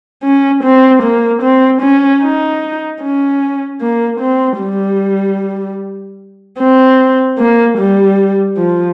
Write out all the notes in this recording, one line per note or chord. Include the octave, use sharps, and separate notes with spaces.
C#4
C4
A#3
C4
C#4
D#4
C#4
A#3
C4
G3
C4
A#3
G3
F3